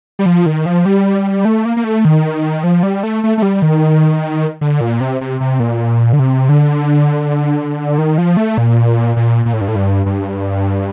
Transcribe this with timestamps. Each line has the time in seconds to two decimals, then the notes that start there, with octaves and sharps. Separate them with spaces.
0.19 G3
0.26 F3
0.46 D#3
0.66 F3
0.86 G3
1.45 A3
1.65 A#3
1.77 A#3
1.84 A3
2.05 D#3
2.64 F3
2.83 G3
3.03 A3
3.24 A3
3.38 A3
3.42 G3
3.62 D#3
4.61 D3
4.81 A#2
5.01 C3
5.21 C3
5.40 C3
5.60 A#2
6.13 D3
6.19 C3
6.49 D3
7.98 D#3
8.18 F3
8.37 A3
8.58 A#2
9.16 A#2
9.46 A#2
9.53 A2
9.61 G2
9.68 A2
9.76 G2
10.06 G2